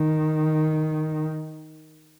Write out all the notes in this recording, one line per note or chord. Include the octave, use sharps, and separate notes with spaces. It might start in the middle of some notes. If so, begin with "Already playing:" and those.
Already playing: D#3